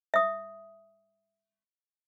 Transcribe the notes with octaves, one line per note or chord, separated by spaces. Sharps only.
E5 D#6